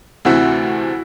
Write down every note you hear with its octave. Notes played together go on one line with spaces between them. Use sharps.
D2 C3 E3 A3 C4 E4 F#4